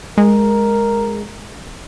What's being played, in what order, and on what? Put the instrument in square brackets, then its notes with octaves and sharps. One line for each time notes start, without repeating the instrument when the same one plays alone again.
[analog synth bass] G#3 [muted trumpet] A#4